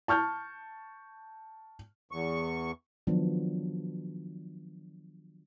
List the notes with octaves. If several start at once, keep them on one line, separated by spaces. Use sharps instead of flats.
A5 C#6 F6 G6
E2 C#6
D#3 F3 F#3 B3 D4 F4